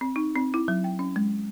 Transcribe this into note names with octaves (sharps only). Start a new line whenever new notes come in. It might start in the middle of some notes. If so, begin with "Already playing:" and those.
C4
D#4
C4
E4
F#3
G5
C#4
G#3